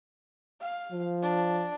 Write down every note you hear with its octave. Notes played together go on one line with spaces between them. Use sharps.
F5
F3
D4